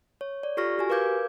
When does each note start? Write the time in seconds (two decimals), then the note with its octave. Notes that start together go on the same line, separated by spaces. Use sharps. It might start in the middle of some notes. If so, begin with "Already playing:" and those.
0.21 C#5
0.43 D5
0.57 F4 G4 A4 C#6 F6 A#6
0.78 F#4 G4 G#5
0.90 A#4 B4 F5 D6 G6 G#6